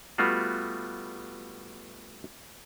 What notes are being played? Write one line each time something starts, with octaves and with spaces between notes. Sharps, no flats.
G3 A3 B3 F4 F#4